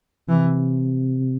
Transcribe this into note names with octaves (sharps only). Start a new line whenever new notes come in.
C3 E3